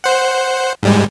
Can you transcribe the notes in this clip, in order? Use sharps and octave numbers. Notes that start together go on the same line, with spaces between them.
C5 F#5
G#2 G3 G#3